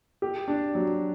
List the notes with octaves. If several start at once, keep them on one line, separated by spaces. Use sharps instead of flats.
G4
D4
F#3